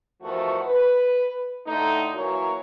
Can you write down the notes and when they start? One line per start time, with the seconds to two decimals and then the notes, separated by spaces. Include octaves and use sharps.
0.22 E2 D#3 F3 A3 F#4
0.66 B4
1.67 A2 D3 A3 D#4
2.14 E3 F#3 A#3 F#4 A#4 C#5